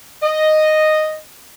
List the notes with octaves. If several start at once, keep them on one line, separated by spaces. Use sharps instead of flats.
D#5